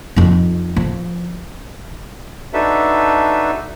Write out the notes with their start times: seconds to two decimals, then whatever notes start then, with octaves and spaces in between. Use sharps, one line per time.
0.16 F2 D#4
0.76 F3
2.54 D4 D#4 F#4 A4 B4 E5